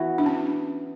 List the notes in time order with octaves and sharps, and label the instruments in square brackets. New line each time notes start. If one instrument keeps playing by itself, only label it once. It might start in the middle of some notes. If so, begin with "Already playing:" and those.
Already playing: [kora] E3 B3 F#4
[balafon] D4
C#4